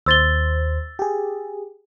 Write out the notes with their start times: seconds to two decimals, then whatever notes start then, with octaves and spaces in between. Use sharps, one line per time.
0.06 D#2 C5 E6 A6 G7
0.99 G4 G#4